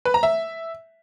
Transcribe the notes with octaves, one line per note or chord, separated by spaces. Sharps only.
B4
A#5
E5